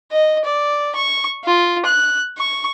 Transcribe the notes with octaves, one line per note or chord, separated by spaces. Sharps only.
D#5
D5
C#6
F4
F#6
C#6